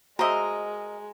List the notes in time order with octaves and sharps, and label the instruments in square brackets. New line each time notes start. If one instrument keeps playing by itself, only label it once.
[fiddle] G#3 [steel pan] F#4 C5 E5 [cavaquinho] A#4 D#5 [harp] A#5